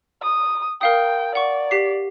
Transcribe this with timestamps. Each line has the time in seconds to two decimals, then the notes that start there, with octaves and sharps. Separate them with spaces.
0.22 D#6
0.81 A#4 F5 G5 D#6
1.35 D5 F#5 C#6
1.71 G4 B6 C7